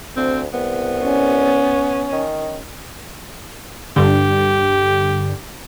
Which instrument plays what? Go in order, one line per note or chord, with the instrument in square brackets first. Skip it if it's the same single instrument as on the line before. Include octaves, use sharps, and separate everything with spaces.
[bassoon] D2 [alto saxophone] C4
[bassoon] C2 [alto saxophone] B3
[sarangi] C#4
[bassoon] D#3
[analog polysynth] G2 D3 [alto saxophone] G4